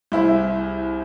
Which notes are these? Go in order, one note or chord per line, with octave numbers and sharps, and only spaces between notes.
C2 E4 G#4 C5